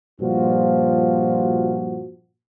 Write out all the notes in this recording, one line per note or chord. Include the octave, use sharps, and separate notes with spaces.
G2 A#2 F3 F4 F#4